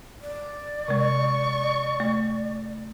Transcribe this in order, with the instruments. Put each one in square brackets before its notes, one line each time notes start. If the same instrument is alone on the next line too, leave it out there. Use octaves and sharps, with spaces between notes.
[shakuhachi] D5
[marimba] C3 G#3 [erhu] C#6
[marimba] A3